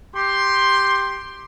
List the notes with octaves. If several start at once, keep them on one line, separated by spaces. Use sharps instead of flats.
G4 C6